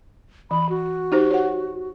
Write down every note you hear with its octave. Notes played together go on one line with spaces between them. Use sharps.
E3 B5
F#4
D#4 G4 C5
C#5 F#5